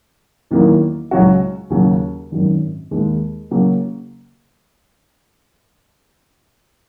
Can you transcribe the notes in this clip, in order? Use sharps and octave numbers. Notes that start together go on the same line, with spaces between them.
E2 D#3 F#3 A#3 E4
C#2 C#3 F#3 C#4 F#4
D#2 C#3 F#3
G#1 F#2 D#3 F#3
D#2 D#3 G#3
C#3 F#3 A#3